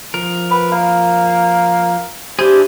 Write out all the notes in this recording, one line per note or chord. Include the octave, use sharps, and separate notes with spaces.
F3 A#4
B4
A#3
D4 E4 G4 G#4 C5